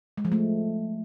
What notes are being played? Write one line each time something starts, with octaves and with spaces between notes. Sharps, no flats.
G#3
F3
A3